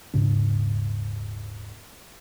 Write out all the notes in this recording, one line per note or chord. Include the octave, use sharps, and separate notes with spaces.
D#1 G#2 C#3 D4